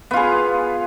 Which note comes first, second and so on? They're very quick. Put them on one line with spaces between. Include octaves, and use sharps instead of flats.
B3 F4 G#4